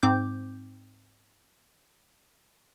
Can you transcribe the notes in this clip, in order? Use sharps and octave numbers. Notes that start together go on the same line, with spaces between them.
G#2 C4 D6 G6